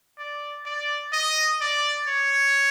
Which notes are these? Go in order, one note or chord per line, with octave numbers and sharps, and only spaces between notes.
D5
D5
D#5
D5
C#5